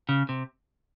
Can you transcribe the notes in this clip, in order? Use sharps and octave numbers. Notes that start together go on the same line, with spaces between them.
C#3
C3